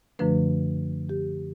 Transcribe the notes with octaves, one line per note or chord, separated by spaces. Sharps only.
F#2 D3 F3 A3 D4 B4
G4